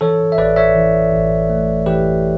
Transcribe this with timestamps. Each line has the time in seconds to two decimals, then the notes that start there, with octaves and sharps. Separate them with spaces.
0.01 E3 A4 C#5
0.32 E5
0.38 A1 B4 D5
0.56 C#5 E5
0.75 E3
1.13 A1
1.50 A3
1.86 E3 G4 B4